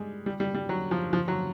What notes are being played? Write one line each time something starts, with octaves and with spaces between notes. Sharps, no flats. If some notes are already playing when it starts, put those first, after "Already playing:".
Already playing: G3 G#3
G3
G3
G3
F#3
F3
F3
F#3